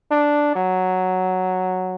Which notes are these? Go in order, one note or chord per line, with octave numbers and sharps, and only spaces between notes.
D4
F#3